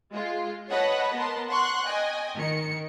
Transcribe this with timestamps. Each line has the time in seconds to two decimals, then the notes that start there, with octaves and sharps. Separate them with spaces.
0.12 G#3 F4
0.71 B4 C#5 D#5 F#5 A5 B5
1.15 B3 A#4 A5 C6
1.49 F#5 C6 C#6 F#6
1.86 D#5 G5 G#5
2.36 D#3 C#7